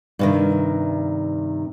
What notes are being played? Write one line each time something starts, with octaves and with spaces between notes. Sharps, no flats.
G2 C3 D#3